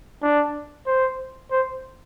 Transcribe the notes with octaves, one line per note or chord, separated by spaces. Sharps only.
D4
C5
C5